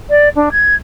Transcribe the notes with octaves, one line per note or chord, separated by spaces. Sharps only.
D5
D4
G#6